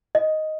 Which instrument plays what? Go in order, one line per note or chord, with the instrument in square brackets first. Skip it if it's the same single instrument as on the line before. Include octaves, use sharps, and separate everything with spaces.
[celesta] D#5